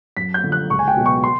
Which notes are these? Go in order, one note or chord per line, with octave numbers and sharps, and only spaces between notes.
F#2 B6
G6
D3 F3
F#6
C#2 C#6
G#5
G5
B2 F#3 B3
C#6
C6